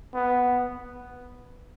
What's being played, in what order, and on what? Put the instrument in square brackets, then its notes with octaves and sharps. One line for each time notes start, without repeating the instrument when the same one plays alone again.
[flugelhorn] B3